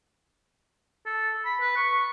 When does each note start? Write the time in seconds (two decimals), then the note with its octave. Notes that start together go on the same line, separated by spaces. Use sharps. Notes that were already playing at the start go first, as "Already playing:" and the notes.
1.06 A4
1.45 B5
1.61 B4
1.76 C#6